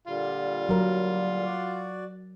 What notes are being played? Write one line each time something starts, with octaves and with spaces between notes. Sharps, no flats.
A#2 D3 G3 F4
F#3 A#4
F#4 D5